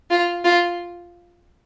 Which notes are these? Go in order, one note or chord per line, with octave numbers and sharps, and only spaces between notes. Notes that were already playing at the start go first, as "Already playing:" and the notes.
F4
F4